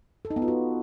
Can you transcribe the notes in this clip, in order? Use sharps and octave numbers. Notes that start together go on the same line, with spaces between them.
A4
D#4
B3
F4
F#4